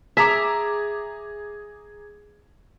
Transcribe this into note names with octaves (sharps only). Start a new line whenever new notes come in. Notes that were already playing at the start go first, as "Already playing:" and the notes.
G#4 E5 A#5 D6